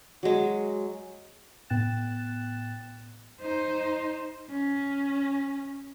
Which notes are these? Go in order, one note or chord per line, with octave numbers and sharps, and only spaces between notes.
F#3 G#3
A2 B3 G5 F#6 A6 E7
D#4 C5
C#4